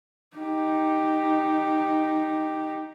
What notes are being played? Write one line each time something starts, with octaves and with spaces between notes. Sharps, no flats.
D#4 G4